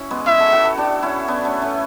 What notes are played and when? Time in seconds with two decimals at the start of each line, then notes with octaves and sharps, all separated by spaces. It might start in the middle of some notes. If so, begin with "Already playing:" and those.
Already playing: C#4 E4 F#4
0.10 G#3 B3
0.27 E4 G#4 E5
0.40 F#4 A4
0.52 F#4 A4
0.65 F#4 A4
0.77 D4 F#4
1.03 C#4 E4
1.28 B3 D4
1.45 A3 C#4
1.62 A3 C#4